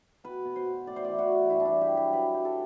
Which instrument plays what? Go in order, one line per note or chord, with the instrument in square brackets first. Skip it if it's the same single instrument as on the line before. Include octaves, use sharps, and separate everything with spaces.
[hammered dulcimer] B2 B4
B2
C5
B2
A2 D5
C5
E3 D5
F#4
E3
G2 E4
D4
E4
G2
G4
F#3
G4
F#3 B4
F#3 G4
A4